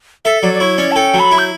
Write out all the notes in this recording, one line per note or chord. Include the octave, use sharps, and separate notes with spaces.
A4 E5
F#3 D5
D5
E4 C#5
C#4 D5
A5
A4 G5
F#3
B5
E4
G6